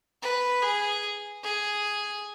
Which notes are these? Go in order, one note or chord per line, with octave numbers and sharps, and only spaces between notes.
B4
G#4
G#4